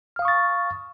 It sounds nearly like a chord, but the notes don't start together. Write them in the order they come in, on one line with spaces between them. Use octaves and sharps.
F6 F5 D#6 C#6 A6